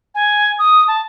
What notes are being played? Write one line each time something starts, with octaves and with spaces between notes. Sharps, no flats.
G#5
D#6
A5